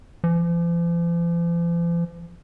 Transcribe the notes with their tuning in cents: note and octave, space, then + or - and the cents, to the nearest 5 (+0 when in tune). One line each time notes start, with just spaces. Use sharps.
F3 -45